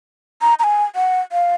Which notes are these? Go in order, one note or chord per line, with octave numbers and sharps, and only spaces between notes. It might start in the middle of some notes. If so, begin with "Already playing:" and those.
A#5
A#5
G#5
F#5
F5